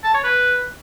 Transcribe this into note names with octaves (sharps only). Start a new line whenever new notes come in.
A5
C#5
B4